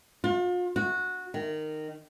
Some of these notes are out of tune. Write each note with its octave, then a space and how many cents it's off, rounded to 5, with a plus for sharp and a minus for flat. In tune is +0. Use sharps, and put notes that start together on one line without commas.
F4 +40
F#4 -15
D#3 -15